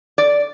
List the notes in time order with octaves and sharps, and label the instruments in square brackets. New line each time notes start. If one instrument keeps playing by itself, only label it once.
[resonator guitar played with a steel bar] D5